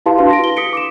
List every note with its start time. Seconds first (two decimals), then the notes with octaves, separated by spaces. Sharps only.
0.06 E4 G4 B4 F5 A5 C6
0.18 D4 E4 F#4 B4 F5 C6
0.30 A#6 D7
0.44 G7
0.57 D#6 B6 C#7 D7
0.73 D6 D7 E7